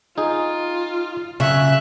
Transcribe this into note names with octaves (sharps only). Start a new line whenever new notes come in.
D#4 F4 G#4
C#3 F#3 E5 F#6